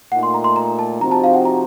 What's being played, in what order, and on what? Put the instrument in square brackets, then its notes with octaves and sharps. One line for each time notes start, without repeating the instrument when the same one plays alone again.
[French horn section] A#2 A3 D#4 [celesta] F#5
[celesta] C6
A#5
C6
A#5
A5
[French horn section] C3 F3 C4 D#4 F#4 [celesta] A#5
[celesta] A5
F5
F#5
A#5